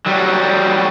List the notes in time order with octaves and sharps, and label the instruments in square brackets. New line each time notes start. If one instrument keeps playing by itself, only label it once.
[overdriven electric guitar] F#3 G3